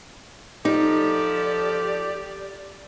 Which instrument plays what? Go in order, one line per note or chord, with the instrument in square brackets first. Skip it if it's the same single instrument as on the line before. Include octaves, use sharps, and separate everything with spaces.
[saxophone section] F3 A4 [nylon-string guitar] D#4 [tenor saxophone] G4 [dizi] D5